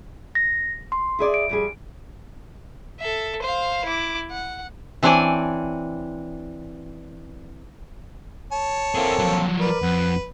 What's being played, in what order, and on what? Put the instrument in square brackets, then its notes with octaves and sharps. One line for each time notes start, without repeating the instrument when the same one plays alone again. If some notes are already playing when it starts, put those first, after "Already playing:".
[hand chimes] A#6
C6
[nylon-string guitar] E4 G#4 D5
[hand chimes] D7
[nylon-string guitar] F2 G3 G#4
[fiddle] A4 E5
C5 F5
E4 D6
F#5
[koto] E3 C4 D4 C#5 D5 G#5
[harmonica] C#5 A5
[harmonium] A#3 C4 A4 [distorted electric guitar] E4 G#4
[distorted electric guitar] F3 F#3
[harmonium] A#4 D5 [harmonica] B4
[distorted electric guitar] F2 [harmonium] F#5